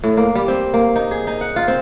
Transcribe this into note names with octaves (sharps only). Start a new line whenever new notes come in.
A2
A#3
G3
C4
A#3
D#4
G#4
D#4
F#5
F4
C4